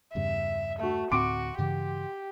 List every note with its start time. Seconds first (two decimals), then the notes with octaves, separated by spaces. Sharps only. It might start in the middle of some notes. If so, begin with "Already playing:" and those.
0.15 E2 G2 C#3 E5
0.79 A3 F#4 E5
1.11 D2 A2 C4 F#4 C6 D6 D7
1.58 G2 C#3 E3 G4